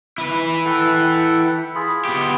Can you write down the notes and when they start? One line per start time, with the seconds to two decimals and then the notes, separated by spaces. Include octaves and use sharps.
0.18 E4 B4
0.66 A4 F#5 G5
1.75 F4 G#4 B5
2.05 B3 G4